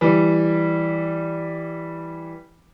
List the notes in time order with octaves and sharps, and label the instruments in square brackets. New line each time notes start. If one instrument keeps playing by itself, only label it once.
[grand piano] E3 G3